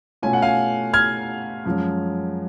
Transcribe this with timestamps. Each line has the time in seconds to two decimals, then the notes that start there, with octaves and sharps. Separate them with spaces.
0.22 B2 A3 C#4 F4 G#5
0.33 F#5
0.42 F5 G#5
0.94 F6 G#6
1.66 F#2 F3 G#3 C#4